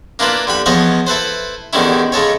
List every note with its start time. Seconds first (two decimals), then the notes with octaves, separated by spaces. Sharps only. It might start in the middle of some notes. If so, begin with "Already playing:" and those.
0.19 A#3 D4 E4 F4 B4
0.47 D3 G3 B5
0.66 E3 F3 B3 G#4 C#5 D#5
1.07 E4 A4 B4 C5
1.73 E2 D3 D#3 G3 C#4 E4
2.12 C#3 G#3 A4 C#5